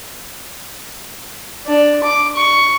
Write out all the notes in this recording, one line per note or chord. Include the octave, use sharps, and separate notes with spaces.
D4
D6
C#6